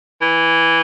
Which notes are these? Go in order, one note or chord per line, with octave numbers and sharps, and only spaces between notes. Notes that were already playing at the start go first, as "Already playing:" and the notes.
E3